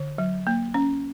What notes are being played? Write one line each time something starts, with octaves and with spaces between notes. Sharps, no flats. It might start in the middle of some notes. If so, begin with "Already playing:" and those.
Already playing: D3
F#3
A#3
C#4